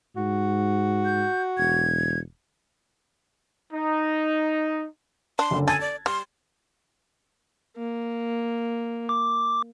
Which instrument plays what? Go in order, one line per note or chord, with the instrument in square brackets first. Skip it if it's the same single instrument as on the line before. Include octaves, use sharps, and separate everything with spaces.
[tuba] G#2 [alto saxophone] F#4
[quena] G6
[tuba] E1 [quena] G#6
[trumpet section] D#4
[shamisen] D4 [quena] C6
[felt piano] F#1 D3
[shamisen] A4 [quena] G#5 [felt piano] G#6 A6
[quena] D5
[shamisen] G3 [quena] C6
[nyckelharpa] A#3
[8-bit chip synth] D6